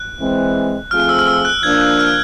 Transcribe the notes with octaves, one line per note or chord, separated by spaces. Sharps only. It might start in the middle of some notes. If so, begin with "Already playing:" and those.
Already playing: F#6
E3 G#3 C4
F3 A3 C4 F4 G#4 F6
E6
F6
E6
F#6
F3 A#3 D4 G#6
F#6
F6